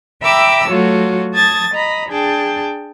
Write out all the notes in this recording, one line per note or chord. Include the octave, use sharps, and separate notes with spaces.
E5 G5 A#5 B5 D6 E6
F#3 A3 F4 F#4 C#5
A5 D#6 G#6 A6
D#5 A#5 B5
D4 G#4 G5 A5